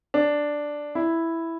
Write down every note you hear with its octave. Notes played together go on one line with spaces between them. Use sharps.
D4
E4